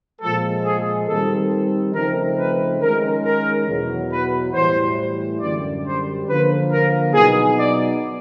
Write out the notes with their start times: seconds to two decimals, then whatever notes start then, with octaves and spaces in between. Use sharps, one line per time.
0.21 A#2 F3 G#3 A4
0.64 G#4
1.07 D#3 G3 C4 D#4 A4
1.94 C#3 F3 A3 C4 D#4 A#4
2.38 B4
2.81 D#3 G#3 C#4 A#4
3.24 A#4
3.67 E2 B2 F#3
4.11 B4
4.53 A2 E3 G3 C5
5.40 F#2 D3 G3 D5
5.84 C5
6.28 D3 F3 A#3 B4
6.71 A#4
7.13 B2 F#3 B3 D#4 G#4
7.58 D5